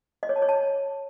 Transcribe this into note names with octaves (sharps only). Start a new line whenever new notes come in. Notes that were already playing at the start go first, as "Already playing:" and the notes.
D#5
C#5
A5
C#5
A5